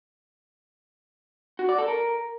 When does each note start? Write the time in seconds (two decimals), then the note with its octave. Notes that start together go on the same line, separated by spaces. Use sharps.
1.59 F#4
1.69 D5
1.78 A4
1.88 A#4